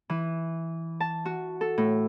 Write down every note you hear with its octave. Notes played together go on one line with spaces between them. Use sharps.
E3
A5
F#4
A4
A2